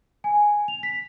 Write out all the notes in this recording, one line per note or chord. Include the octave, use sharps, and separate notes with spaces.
G#5
F7
B6